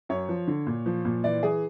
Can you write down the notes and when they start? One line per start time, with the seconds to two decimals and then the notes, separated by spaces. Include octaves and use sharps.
0.09 F#2 C#5
0.29 F3
0.47 D3
0.66 A#2
0.86 F3
1.05 A#2
1.24 E3 D5
1.43 E3 G#4